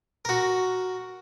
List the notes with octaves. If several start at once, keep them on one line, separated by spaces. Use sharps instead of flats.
F#4 A#4